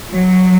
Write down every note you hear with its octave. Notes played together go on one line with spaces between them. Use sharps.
F#3